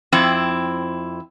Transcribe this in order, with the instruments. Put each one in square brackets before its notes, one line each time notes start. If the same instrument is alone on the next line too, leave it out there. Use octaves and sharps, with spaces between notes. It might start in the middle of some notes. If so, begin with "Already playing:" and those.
[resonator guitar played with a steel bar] F2 C4 E4